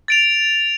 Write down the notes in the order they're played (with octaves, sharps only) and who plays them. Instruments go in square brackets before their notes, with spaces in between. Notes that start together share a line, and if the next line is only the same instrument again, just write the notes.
[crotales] A6 D7 F7